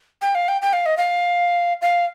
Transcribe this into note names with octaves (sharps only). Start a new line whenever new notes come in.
G5
F5
G5
G5
F5
D#5
F5
F5